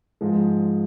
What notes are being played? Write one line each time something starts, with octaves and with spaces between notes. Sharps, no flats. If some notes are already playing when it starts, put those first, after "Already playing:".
G#2 F3 G#3